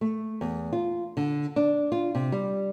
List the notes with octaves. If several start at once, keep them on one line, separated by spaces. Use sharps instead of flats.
A3
E2
F4
D3
D4
F4
C3
G3